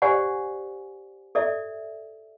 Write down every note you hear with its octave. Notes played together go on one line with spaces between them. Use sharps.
G4 C5 D5 F#5 G#5
A4 D5 E5